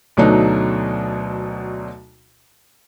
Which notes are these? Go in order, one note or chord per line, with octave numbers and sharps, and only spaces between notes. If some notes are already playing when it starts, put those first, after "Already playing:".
D2 B2 F#3 A3 D4 D#4